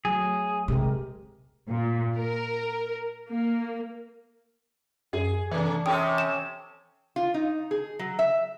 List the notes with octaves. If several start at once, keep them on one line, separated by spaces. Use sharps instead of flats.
F#3 A3 G#4
C3 G#3 G4 A#4
A#2
A#4
A#3
F#2 G#4
C3 E3 A3 D4
C3 C#4 A4 G5 D#6
E7
F4
D#4
G#4
F#3
E5